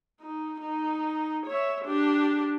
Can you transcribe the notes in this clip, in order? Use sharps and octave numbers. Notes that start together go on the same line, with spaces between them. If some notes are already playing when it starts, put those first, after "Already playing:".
D#4
D#4
C#5 E5
D4 G4